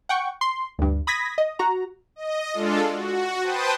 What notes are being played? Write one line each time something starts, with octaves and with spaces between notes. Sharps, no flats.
F#5 G5 C#6
C6
D2 G2
B5 D#6 G#6 A#6 B6
D#5
F#4 A#5
D#5
G#3 D4 F4 A4
F#4
B4 C5 G5 A5 D#6